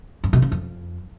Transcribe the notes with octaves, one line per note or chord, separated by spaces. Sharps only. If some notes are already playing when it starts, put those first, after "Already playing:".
G2
B2
C#3
F2